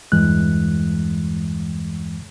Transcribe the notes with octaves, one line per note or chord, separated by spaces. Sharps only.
E2 G2 E3 G#3 F#6